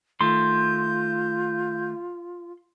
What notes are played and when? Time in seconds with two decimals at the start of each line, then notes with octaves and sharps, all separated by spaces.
0.21 D#3 A3 F4 C6 G6